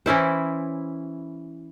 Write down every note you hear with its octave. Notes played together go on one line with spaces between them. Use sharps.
E3 C#4 E4 C5